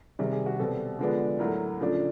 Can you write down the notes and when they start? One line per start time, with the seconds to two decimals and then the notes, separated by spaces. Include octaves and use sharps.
0.19 C3 D#3 G3 G#4
0.32 G#4
0.46 F#4
0.59 B2 G3 C4 A4
0.99 D3 F3 G#3 B3 D4
1.39 A2 F#3 A3 A#4
1.80 C#3 F3 A3 D4